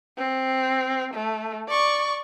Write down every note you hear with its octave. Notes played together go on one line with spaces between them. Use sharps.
C4
A3
D5 C#6